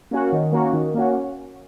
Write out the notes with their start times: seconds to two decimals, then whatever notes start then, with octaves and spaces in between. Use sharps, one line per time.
0.11 A#3 C#4 F#4
0.32 D#3
0.53 A#3 C#4 F#4
0.73 D#3
0.94 A#3 C#4 F#4